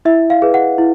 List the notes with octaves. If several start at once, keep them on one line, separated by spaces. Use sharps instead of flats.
E4 E5
F5
G#4 B4
F#5
E4